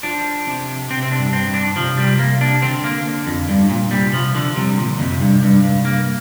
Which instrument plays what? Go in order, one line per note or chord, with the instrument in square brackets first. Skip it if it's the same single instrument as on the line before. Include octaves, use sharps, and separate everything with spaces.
[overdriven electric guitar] F3 [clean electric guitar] D4
[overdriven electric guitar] C3
[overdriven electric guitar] C3 [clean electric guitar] C4
[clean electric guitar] C4
D4
[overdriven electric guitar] G2
[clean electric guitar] C4
[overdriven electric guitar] G2
[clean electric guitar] D4
[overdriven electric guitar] C3 [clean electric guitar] F3
[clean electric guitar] G3
A#3
D4
[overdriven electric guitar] D3 [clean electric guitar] C4
[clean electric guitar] A#3
F2
[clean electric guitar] G2 [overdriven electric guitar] D3
[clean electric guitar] A#2
[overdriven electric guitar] C3 [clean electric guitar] G3
[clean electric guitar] F3
[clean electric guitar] D3 [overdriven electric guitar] F3
[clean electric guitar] C3 [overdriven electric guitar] G3
[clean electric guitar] A#2 [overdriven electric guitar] D3
[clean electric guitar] F2 [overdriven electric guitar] C3
[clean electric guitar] G2
G2
G2
A#3